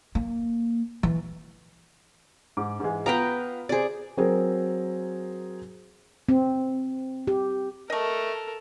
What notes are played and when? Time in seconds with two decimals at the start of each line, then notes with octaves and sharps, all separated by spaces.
0.15 A#3
1.03 E3
2.57 G#2 D6
2.80 G#2 E3 G#3
3.06 B3 F4 B4 F5 G5 A#5
3.69 C3 G#4 C5 D5
4.17 F#3 C4 G#4 A#4
6.29 C4
7.27 G4
7.90 A3 A4 A#4 D#5